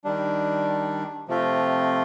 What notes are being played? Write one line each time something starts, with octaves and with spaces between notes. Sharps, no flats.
D#3 G3 D4
C3 F3 A3 C4 F4